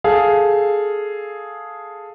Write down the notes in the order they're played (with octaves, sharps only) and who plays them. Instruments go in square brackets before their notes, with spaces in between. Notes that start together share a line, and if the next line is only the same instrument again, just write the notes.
[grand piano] G#4 A4 F5